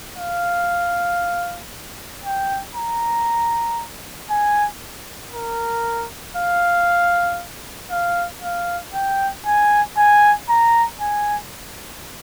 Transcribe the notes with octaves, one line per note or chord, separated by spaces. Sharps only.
F5
G5
A#5
G#5
A#4
F5
F5
F5
G5
G#5
G#5
A#5
G#5